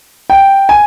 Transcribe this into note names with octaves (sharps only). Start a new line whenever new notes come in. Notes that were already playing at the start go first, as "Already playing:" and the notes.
G5
G#5